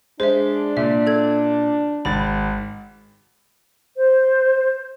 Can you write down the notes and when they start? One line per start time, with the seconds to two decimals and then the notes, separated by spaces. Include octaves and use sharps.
0.20 G#3 D4 C5 E5
0.77 A#2 E5
1.07 A4 G#6
2.05 G#1 B5 A6
3.97 C5